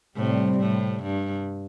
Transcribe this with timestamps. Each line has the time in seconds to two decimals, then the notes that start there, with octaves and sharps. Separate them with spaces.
0.15 A2 C3 G3 C4
0.60 A2
1.03 G2